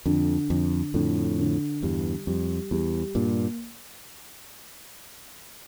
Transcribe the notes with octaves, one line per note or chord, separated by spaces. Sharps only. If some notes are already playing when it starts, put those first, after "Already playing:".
F2 D3
F2 D3
F2 A2 D3
D3
E2 G2 G3
F2 G3
E2 G3
G2 A#2 A#3